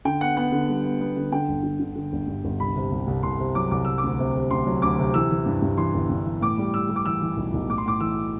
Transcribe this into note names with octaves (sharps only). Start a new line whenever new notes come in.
D3 G5
B3 F#5
B3 F#5
D3
G3
B3
B3
D3
D3 G5
G1
D3
D3
D3
G1
G2
G1
C2 B5
C3
C2
C2
C2 C6
C3
F#3 D6
C2 D6
C3 E6
D6
D2
C3
C3
D2 C6
F#3
D2 D6
C3
E3 E6
E3
G2
G2
E3 C6
G1
G2
E3
A2 D6
G3
G3 E6
G3
D6
E3 E6
E3
B1
B1
A2 D6
C6
A2 D6
E3 E6